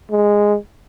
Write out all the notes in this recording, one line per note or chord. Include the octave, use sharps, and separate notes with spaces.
G#3